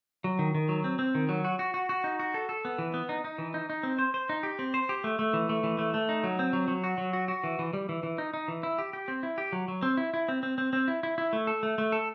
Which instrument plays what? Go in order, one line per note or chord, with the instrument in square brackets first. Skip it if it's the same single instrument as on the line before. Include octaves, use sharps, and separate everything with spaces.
[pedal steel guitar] F#3
D#3
D#3
F#3
C4
C4
D#3
F#3
F#4
F#4
F#4
F#4
D#4
F#4
A4
A4
B3
E3
B3
D#4
D#4
E3
D#4
D#4
C4
C5
C5
D#4
G4
C4
C5
G4
A3
A3
E3
A3
E3
A3
A3
D#4
F#3
C4
F#3
F#3
F#4
F#3
F#4
F#4
E3
E3
G3
E3
E3
D#4
D#4
E3
E4
G4
G4
C4
E4
G4
F#3
F#3
C4
E4
E4
C4
C4
C4
C4
E4
E4
E4
A3
A4
A3
A3
A4